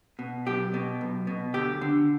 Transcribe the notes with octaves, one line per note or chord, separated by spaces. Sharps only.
B2
B1 G4
B2
B1
B2
D2 G4
D3